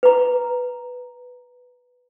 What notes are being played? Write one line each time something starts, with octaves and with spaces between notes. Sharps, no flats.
B4 A#5